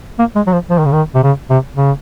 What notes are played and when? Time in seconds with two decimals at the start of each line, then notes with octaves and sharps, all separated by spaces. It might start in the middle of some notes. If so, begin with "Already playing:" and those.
0.19 A#3
0.36 G#3
0.47 F#3
0.53 F3
0.70 F3
0.78 D#3
0.86 C#3
0.92 D#3
1.15 C3
1.24 C#3
1.50 C3
1.76 C#3